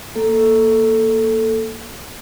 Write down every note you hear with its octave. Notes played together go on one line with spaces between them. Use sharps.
A#3 A4